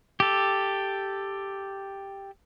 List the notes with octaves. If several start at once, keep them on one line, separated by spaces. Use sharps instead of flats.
G4 A4